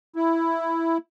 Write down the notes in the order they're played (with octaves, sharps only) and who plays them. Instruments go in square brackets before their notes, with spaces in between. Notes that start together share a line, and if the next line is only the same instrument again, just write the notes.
[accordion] E4